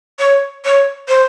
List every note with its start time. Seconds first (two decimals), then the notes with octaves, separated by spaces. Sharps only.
0.19 C#5
0.65 C#5
1.08 C5